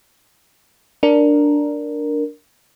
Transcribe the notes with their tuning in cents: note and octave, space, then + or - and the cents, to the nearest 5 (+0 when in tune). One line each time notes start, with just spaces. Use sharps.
D4 +0 A#4 +0